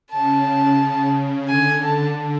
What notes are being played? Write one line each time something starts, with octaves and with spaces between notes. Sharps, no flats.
C#3 A5
D3 G#5
A5